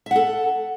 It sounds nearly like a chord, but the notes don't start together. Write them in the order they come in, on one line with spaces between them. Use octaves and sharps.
E5 F#5 A4